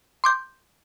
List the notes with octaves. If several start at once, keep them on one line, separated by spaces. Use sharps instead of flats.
C6 D6 G6